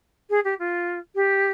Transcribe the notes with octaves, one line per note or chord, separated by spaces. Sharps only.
G#4
G4
F4
G4